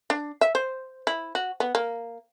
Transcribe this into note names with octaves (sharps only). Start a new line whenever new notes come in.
D4
E5
C5
E4
F#4
B3
A#3